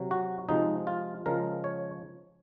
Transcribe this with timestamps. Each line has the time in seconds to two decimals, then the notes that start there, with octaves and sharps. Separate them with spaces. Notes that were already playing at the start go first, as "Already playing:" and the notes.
Already playing: C3 F#3
0.11 F#4
0.49 C3 F3 G#3 D#4
0.87 F4
1.26 C#3 F3 G#3 A#4
1.64 C#5